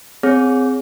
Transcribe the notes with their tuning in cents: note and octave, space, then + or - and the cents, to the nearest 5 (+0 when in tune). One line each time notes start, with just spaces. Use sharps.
C4 -25 G#4 +0 C#5 +0